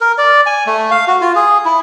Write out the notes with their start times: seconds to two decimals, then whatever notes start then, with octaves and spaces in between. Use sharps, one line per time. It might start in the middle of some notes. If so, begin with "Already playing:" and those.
0.01 A#4
0.18 D5
0.46 G#5
0.66 A3
0.91 F5
1.08 F#4
1.21 F4
1.35 G#4
1.65 E4